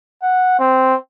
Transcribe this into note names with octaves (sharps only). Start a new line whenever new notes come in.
F#5
C4